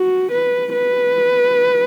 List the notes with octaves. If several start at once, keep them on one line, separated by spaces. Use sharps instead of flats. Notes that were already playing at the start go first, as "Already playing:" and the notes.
Already playing: F#4
B4
B4